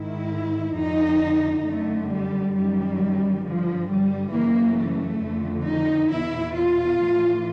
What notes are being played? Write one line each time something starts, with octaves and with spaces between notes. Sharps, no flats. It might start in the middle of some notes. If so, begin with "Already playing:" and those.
Already playing: G#2 D#3 E4
F2 D3 D#4
F#2 D3 A3
G3
F#2 D#3 G3
G2 D3 F3
G3
F#2 C#3 E3 A#3
A3
F2 D3
D#4
E2 B2 E4
F4
A2 E3